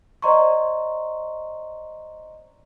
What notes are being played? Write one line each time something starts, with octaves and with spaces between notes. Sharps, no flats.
C5 D5 D#5 A#5 C6 C#6